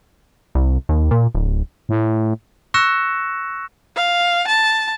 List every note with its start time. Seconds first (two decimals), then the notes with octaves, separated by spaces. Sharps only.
0.55 C2
0.89 D#2
1.11 A#2
1.35 D1
1.89 A2
2.74 C#6 E6 F#6 A#6 C#7 E7
3.95 F5
4.47 A5